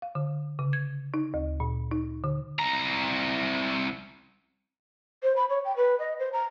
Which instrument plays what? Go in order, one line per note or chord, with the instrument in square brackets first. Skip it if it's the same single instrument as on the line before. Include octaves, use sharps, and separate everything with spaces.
[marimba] F5
D3
C#3
G#6
D#4
D2
A#2
D#4
D3
[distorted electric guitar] C2 A#5
[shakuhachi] C5
B5
C#5
G5
B4
D#5
C5
A#5